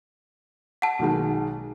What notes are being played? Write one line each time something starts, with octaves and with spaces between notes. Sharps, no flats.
F#5 A5
B1 D#3 G#3